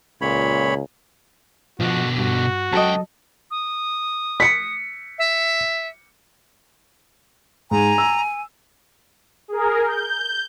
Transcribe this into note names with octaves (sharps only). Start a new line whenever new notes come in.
C#2 A#2 C#5 B5
B2 D3 F3 F#4
G2 F#4
C#2 F#3 A4 D#5 G5
D#6
B6 C#7
E5
G#2 G#5 A#5
E6
G#4 A#4
G6